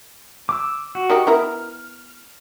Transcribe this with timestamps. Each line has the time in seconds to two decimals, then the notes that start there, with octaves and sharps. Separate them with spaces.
0.49 D6 E6
0.95 F#4
1.10 D#3 D#4 G4
1.27 B3 E4 A#4 F6